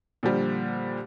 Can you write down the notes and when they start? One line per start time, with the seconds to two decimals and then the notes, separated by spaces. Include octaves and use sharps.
0.23 A#2 D3 F3 G3